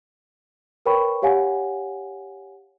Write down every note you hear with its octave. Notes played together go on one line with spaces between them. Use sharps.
A#4 B4 C#5 G5 B5 C#6
G4 C#5 F5 F#5 G#5